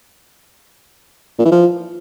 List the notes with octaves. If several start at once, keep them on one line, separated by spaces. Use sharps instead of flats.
A#2
E3
F3